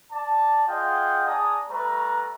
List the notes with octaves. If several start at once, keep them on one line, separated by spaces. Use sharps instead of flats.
D5 A5
F4 G#4 D#5 F#5 G5
D4 G#4 D5 G#5 A#5 D#6
G3 A3 B4 A#5